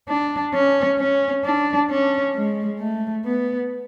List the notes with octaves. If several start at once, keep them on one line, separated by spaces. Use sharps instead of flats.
D4
C#4
C#4
D4
C#4
G#3
A3
B3